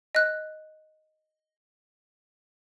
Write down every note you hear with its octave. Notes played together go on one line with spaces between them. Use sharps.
D#5 F#6